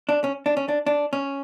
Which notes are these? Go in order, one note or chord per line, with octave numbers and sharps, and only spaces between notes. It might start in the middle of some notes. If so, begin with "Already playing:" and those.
D4
C#4
D4
C#4
D4
D4
C#4